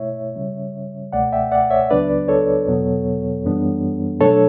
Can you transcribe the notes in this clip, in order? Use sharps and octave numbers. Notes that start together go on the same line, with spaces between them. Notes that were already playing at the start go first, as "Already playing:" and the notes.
Already playing: B2 A3 E4 C#5 E5
C#3 G3 C#4
C#2 B2 A3 D5 F#5
E5 G5
D5 F#5
C#5 E5
C#2 C#3 F#3 B3 D4 B4 D5
A4 C#5
E2 B2 F#3 B3
F#2 E3 G3 B3 D4
B2 F#3 A3 D4 A4 C#5